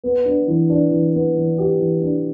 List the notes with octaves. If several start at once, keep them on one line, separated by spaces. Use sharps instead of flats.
B3
D4
E3
D4
E3
B3
E3
G4
E3
D4